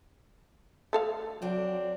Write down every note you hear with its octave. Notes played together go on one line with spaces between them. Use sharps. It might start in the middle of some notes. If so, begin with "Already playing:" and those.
A3 A4 F5
F#3 C4 D4